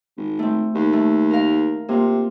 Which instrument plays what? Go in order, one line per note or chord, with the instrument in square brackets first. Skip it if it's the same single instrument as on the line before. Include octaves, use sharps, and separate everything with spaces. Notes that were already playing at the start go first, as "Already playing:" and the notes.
[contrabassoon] G#1
[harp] A3 C4
[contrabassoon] D#2
[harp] A3
A#4 F5
[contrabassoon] C3 [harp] A#3 F4